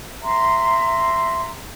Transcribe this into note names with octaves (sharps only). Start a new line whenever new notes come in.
E5 A#5 C6